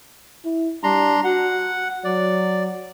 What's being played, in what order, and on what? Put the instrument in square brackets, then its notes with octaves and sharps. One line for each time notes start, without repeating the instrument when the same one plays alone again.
[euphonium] E4
[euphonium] G3 [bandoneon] D4 A#5 C6
[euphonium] F#4 [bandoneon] F#5
[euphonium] F#3 [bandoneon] D5